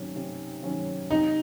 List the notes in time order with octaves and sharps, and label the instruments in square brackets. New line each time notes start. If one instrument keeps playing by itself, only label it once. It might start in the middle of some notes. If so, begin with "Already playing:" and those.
Already playing: [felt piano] C3 D#3 F#3 C#4
C3
D#3 F#3 C#4
[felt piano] C3 [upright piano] D#4